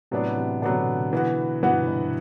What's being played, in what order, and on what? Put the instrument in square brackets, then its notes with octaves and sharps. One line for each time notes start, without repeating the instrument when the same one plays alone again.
[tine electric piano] A2 C3 [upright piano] F#3 B3 D4
[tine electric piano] C3 E3
[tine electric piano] B2 D3 [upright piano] F#3 B3 D4
[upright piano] E3 B3 F#4
[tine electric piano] G2 B2 [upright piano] E3 B3 F#4
[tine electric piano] C3
G2 B2